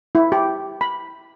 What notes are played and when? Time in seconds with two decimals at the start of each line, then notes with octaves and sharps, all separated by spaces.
0.15 E4
0.32 G4
0.81 B5